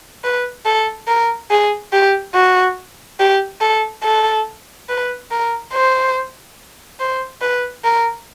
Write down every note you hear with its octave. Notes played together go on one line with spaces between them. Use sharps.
B4
A4
A#4
G#4
G4
F#4
G4
A4
A4
B4
A#4
C5
C5
B4
A#4